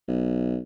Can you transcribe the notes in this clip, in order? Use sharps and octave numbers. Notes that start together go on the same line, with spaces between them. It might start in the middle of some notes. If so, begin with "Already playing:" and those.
B1